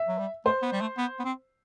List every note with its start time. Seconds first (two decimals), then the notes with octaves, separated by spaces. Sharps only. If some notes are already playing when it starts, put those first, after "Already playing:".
Already playing: E5
0.08 F#3
0.18 G3
0.45 A3 C5
0.62 B3
0.72 G3
0.81 A3
0.98 B3
1.20 B3
1.25 C4